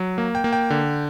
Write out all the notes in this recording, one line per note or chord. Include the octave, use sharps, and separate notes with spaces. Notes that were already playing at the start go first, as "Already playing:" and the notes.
Already playing: F#3
A#3
G5
A#3
G5
D3